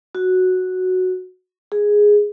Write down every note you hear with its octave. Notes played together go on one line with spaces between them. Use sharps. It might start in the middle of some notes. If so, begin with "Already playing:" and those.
F#4
G#4